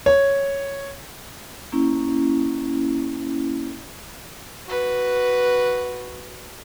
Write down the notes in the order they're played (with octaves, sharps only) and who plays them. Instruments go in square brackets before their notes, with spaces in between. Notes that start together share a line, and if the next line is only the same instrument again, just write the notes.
[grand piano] C#5
[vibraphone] A#3 C#4 E4
[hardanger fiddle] F#4 B4